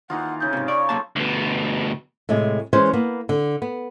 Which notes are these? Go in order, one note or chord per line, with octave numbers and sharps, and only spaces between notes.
D#2 E3 D#4 F4 F#5
C#3 D#4 G6
G#2 C3 F5
D5 C#6
B1 A#3 A4 A5 C6
D2 B2
A2 C3 G#3 G#5
E3 G#3 C#4 B4 C5
A#3 B3 B4
D3
B3